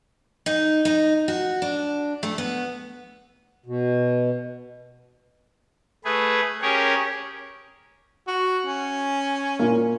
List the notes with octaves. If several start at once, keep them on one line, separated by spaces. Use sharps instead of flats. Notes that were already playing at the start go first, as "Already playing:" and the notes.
D#4
D#4
F#4
D4
A3
B3
B2
A3 G#4 B4
C#4 G4 G#4 A#4 C#5
F#4
C#4
A#2 A#3